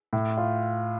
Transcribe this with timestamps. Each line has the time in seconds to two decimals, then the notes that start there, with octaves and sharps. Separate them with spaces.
0.13 A2
0.37 F4